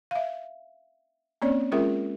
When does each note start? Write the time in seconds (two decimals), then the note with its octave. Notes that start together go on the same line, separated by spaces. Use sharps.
0.11 E5 F5
1.42 A#3 C4 C#4 C#5 D5
1.72 G#3 C#4 F4 G#4 A#4 E5